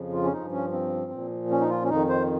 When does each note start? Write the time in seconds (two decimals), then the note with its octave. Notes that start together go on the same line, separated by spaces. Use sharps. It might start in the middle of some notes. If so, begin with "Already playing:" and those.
Already playing: F2 C#3 F3
0.13 F4
0.24 C#4
0.32 G2 F3 D#4
0.52 C#4
0.72 C4
1.12 A#2 F3
1.51 C#4
1.61 D#4
1.70 F4
1.83 C#4
1.89 F2 D#3 D#4
2.09 C5